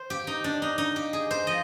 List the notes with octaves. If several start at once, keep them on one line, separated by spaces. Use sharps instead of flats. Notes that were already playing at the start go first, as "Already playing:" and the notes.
Already playing: C5
G4
D#4
D4
D#4
D#4
G4
G#4
C5
F3 D#5